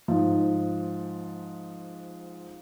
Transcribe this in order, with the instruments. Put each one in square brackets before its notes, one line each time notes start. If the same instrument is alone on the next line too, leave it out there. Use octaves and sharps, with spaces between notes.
[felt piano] G#2 F3